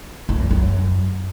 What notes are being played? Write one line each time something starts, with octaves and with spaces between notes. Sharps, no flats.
F#2
E2
F#2